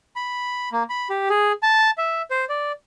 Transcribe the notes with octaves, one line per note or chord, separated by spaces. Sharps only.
B5
A#3
B5
G4
G#4
A5
E5
C5
D5